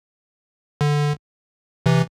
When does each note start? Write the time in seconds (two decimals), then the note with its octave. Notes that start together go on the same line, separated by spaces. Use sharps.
0.81 D3
1.86 C3 E3